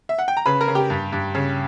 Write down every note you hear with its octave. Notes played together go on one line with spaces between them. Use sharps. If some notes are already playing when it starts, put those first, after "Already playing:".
E5
F#5
G5
A#5
C#3 B4 B5
A#4 A#5
C#3
G4 G5
G2
G2
C#3